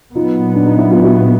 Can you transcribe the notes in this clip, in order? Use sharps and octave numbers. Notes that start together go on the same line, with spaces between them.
A#2 F#3 B3 D#4 F4
D4
D#4
E4
F4
E4 F#4